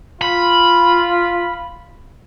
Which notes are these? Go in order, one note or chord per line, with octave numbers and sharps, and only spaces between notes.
F4 B5